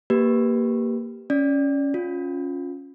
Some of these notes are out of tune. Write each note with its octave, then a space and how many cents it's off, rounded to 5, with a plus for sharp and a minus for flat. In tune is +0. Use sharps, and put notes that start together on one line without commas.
A#3 +0 G4 +0 B4 +0
C#4 +5 D5 +0
C#4 +0 F4 +20